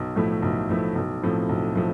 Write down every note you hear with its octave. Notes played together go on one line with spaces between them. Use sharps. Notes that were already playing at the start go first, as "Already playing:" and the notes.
Already playing: B1
A2 F3 A3 E4
B1
A2 F3 A3 E4
B1
A2 F3 C4 E4
B1
A2 F3